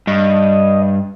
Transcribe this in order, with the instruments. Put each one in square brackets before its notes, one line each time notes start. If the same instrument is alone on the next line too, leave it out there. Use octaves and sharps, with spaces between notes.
[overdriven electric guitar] G2 [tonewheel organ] D#5